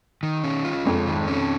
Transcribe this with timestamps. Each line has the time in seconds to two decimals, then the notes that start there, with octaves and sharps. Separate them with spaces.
0.23 D#3
0.44 C#4
0.65 F4
0.85 F2 G#3
1.07 D#3
1.27 C#4